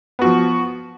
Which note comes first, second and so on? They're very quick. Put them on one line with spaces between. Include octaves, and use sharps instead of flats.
B3 F#4 F3